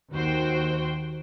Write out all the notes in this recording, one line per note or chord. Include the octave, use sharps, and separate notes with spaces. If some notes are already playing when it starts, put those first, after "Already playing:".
D#2 F#4 C5 G5